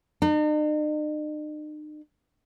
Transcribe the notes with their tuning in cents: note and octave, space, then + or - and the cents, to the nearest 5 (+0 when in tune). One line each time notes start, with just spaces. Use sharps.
D#4 -45